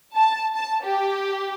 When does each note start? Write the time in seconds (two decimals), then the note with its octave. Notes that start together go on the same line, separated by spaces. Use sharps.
0.14 A5
0.54 A5
0.84 G4